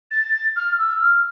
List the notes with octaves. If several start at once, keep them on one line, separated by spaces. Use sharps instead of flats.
A6
F6
E6
F6